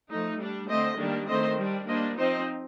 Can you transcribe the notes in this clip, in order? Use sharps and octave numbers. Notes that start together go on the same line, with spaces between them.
F3 A3 D#4
G3 D4
D3 A3 C4 C5 D#5
D#3 G3 A#3 D4
D#3 A3 C4 C5 D#5
G3 D4
G3 A#3 D4 C5 D#5
F3 C4 D#4 C5 D#5